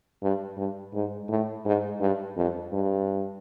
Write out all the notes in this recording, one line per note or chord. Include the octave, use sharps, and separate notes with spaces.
G2
G2
G#2
A2
G#2
G2
F2
G2